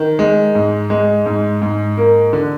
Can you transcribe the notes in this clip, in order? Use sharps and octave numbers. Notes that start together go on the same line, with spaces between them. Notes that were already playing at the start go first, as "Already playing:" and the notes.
Already playing: D#3
G#3
G#2
G#3
G#2
G#2
A#3
D3